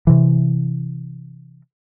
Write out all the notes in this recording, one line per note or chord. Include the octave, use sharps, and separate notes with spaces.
C3 E3